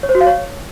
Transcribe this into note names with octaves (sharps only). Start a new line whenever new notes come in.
C#5
C5
F#4
F5
C#5